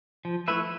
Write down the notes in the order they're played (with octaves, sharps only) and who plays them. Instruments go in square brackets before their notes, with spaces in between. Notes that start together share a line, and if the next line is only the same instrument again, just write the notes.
[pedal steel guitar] F3
A3 E4 B4 E5